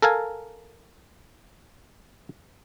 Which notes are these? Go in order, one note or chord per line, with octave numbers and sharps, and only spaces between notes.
A4 A#4 F5 G#5